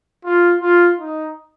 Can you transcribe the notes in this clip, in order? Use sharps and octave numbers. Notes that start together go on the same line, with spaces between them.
F4
F4
D#4